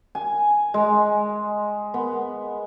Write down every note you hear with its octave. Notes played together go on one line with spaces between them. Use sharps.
G#5
G#3
B3